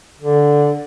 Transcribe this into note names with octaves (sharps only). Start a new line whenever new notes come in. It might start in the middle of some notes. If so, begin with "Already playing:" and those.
D3